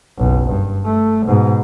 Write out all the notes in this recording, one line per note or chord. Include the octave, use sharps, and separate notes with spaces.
F#1 B1
G2
A3
G#2 B2